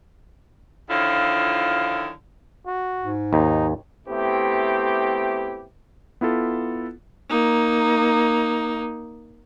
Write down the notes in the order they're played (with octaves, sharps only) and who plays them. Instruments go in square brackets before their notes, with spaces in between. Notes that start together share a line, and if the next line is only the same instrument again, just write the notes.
[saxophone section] D3 D#3 F3 E4 F4 C#5
[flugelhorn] F#4
[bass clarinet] G#2
[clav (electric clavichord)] D#2 [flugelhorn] D#4
[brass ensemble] A3 B3 C4 E4 G4
[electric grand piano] B3 E4 F4 A4
[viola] A#3 D#4